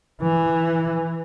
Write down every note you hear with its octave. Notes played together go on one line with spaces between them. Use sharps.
E3